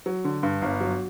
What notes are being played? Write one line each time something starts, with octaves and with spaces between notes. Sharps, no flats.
F#3
D3
G2
G1
F#3